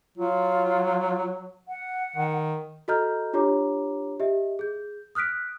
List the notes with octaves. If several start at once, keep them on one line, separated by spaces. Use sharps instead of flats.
F#3 F4
F#5
D#3
F#4 A4 D#5 A#5 F6 G6
D4 F4 G4 C#5 A#5 D6
G4 D#5 E5
G#4 G6
D#6 F6 F#6 B6 D7